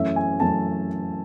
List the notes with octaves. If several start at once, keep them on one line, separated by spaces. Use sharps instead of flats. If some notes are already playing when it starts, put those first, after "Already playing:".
Already playing: F#2 E3 A3 C#4 E5
G#5
F#2 E3 A3 C#4 A5